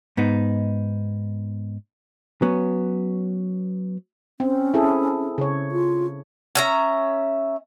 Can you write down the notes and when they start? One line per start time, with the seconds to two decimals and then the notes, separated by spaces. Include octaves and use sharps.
0.17 G#2 B3 D#4
2.42 F#3 B3 C#4
4.40 C4 C#4
4.74 E4 G#4 A4
5.38 C#3 C#5
5.72 F4
6.55 C#4 E5 A#5